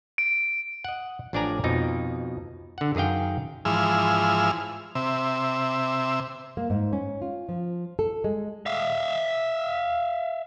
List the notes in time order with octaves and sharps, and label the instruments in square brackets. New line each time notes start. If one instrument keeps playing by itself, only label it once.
[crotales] D7
[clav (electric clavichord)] D#5 F#5
A1 F3 D4 D5 G#5 A#5
F2 B2 F3 D#4
D3 F#5
F#2 D#3 G#4 F5 G5
[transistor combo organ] G#2 E3 F3 G#4 E6 F6
C3 E5
[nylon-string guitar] A#3
G#2
C#4
F4
F3
A4
G#3
[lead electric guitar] E5 F5